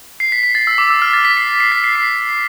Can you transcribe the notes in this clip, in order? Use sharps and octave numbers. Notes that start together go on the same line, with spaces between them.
C7
B6
B6
A6
E6
D6
E6
F6
A6
B6
C7
C7
B6
C7
C7